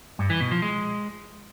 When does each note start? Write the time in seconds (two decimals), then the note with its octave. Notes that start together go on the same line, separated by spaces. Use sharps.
0.19 G2
0.30 E3
0.41 B2
0.51 F3
0.62 G#3